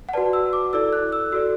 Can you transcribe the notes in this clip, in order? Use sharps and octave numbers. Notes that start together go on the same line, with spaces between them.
F#5
F#4 B4 D5 A5
E6
D6
E4 A4 D5 E6
F#6
E6
F#4 A4 D5 E6